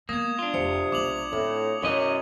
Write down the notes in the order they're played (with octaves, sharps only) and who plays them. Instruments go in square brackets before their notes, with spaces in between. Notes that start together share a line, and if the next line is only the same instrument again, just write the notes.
[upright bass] G#3 B3 [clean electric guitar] A#3 [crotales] D#6 G#6
[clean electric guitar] D4 F4
[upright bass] F1 [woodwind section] C3 [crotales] C#7
[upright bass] B1 G#3 [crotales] D6 F7 F#7
[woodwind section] A2 [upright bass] C4
[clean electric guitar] B1 C#4 D#5 [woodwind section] F#2 [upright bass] E4